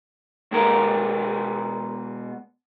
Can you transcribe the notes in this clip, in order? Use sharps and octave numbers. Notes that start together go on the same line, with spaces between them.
B2 G#3 B3 A#4